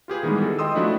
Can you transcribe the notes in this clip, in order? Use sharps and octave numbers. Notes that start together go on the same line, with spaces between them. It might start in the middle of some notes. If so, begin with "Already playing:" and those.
F4 G4 G#4 B4
D#3 E3 G3 G#3 B3
A4
D#5 G5 C6 D#6 E6
F3 A3 D4 E4 F#4